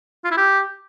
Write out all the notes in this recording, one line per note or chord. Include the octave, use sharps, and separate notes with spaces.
F4
E4
G4